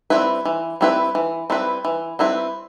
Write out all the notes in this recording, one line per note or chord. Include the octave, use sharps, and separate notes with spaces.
G3 C4 E4 B4
E3
G3 C4 E4 B4
E3
G3 C4 E4 B4
E3
G3 C4 E4 B4